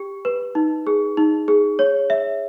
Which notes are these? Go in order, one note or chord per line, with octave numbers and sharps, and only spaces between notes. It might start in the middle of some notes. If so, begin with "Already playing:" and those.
Already playing: G4
B4
D#4
G#4
D#4
G#4
C#5
E5